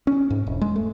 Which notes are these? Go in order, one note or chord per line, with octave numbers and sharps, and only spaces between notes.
C#4
G#2
E1
G#3
A3